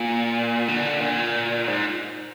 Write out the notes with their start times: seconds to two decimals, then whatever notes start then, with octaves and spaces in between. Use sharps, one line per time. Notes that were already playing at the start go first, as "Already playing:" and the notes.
Already playing: A#2
0.68 D3
1.01 A#2
1.68 G#2